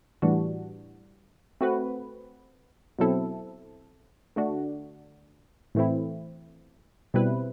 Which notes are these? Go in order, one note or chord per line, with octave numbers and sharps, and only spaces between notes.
A2 E3 G3 D4 F#4
A3 C4 F#4 B4
B2 F#3 C4 E4 A4
D3 A3 D4 F#4
A2 E3 A3 C4 E4
B2 G3 C4 E4 B4